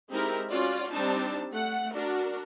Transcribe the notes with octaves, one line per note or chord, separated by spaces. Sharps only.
G#3 C4 D#4 E4 G4 A#4
C#4 F4 F#4 D5
G3 C4 D4 D#4 A5
A3 F#5
D4 F#4 A#4